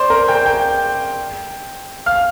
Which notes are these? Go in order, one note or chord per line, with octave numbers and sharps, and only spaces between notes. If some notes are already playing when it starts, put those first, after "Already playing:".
Already playing: C5 D5 C6
A#4 A#5
G5 G6
G5 G6
F5 F6